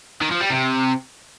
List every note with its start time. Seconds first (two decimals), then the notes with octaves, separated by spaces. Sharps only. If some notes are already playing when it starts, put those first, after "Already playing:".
0.21 D#3
0.31 F3
0.40 G3
0.50 C3